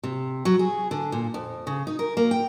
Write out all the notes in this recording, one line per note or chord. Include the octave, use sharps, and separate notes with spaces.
C3
F#3
G#4
D3
A#2
F2
C#3
D#4
A#4
A#3
G5